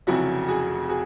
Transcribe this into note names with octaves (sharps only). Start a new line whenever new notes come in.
F1 F2 C#3 F#3 E4 F#4
F#4 G#4
F#4 G#4